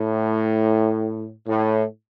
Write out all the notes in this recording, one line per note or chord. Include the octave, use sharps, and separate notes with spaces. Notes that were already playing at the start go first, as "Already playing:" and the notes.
Already playing: A2
A2